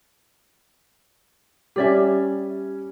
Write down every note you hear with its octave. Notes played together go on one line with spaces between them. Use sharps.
G3 C#4 G4 D5 E5 G#5